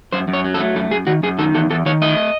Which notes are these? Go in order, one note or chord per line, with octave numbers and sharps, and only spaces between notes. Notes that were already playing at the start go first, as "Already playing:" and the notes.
F#2 C5
F#2
C#5
F#3
A4
A3
F#2 A4
F#2 G#4
D#3 F#4
F#2 G#4
D#3 A4
E2 A4
E2 A4
D#3 C#5
A3 D#5